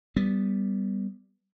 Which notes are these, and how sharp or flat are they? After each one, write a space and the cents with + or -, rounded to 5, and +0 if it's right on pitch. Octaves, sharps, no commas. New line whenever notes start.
G3 +0 B3 +0